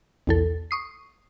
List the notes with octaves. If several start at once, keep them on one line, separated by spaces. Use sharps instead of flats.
B1 E2 A4
C#6 D#6 C7